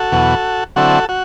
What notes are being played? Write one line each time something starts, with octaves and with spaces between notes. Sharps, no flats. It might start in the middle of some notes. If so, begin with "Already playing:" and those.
Already playing: F#4 A4
E2 B2 F#3
D3 F#3 C4 E4 F#4 A4
F#4